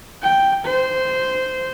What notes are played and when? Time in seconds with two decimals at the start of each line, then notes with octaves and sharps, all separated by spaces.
0.23 G5
0.65 C5